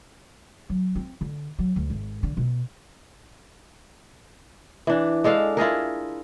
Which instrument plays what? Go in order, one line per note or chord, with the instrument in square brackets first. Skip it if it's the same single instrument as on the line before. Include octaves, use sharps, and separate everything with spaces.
[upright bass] F#3
C4
D3
F#3
D2
G#1
D3
B2
[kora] E3 D4
G#3 D4 A4 F5
E4 F4 G#4 A#4